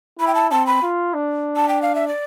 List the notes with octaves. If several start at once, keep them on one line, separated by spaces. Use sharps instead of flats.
E4 B5
G5
A5
C4 A5
B5
F4
D4
A5
G5
F5
E5
D5